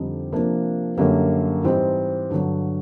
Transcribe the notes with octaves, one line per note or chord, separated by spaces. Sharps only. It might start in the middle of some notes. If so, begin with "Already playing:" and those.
Already playing: F2 D3 G3 C4 D#4
C3 F3 A#3 D4
F#2 D3 G3 A#3
G#2 E3 G3 C4 D#4
G2 D3 F#3